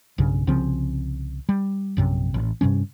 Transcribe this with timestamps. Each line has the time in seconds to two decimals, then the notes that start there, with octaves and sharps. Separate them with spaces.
0.18 B1 G2 C#3
0.47 C2 C#3 F3 C4
1.49 G3
1.97 A#1 F#2 C3
2.34 A1
2.61 G2 C3 G3 C#4